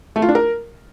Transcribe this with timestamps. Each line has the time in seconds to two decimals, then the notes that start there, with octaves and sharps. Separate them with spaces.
0.16 A3
0.22 F4
0.29 D4
0.35 A#4